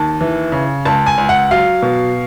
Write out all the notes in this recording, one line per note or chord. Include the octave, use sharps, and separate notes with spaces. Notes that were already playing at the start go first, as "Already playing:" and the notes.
Already playing: D#2 A5
E3
C#3
C#2 A5
G#5
C#2
F#5
F#3 F5
B2